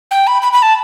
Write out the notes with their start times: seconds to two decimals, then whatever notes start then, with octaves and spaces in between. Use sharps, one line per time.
0.11 G5
0.27 B5
0.42 B5
0.53 B5
0.63 A5